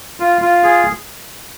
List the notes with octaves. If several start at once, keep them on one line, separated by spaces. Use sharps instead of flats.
F4
F4
G#4